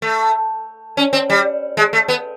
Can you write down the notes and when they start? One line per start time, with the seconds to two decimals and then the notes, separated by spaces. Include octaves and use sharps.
0.02 A3
0.97 C#4
1.13 C4
1.30 G3
1.77 G#3
1.93 A3
2.08 B3